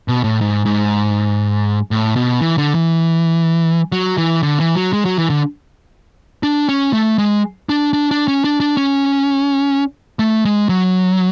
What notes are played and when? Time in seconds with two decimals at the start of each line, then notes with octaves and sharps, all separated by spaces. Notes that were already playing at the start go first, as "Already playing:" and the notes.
0.08 B2
0.24 A2
0.41 G#2
0.66 G#2
1.91 A2
2.16 B2
2.41 E3
2.58 D3
2.75 E3
3.92 F#3
4.17 E3
4.43 D3
4.60 E3
4.76 F#3
4.93 G#3
5.05 F#3
5.18 E3
5.30 D3
6.43 D4
6.69 C#4
6.93 A3
7.18 G#3
7.69 D4
7.93 D4
8.11 D4
8.28 C#4
8.44 D4
8.60 D4
8.77 C#4
10.19 A3
10.45 G#3
10.69 F#3